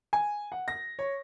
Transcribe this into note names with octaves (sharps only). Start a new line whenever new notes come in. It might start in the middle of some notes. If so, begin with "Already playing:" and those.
G#5
F#5
A#6
C#5